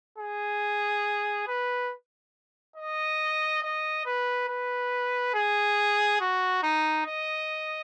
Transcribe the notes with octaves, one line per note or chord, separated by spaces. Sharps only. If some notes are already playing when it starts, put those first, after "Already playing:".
G#4
B4
D#5
D#5
B4
B4
G#4
F#4
D#4
D#5